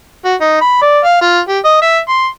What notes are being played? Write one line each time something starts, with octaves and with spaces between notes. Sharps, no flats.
F#4
D#4
B5
D5
F5
F4
G4
D#5
E5
C6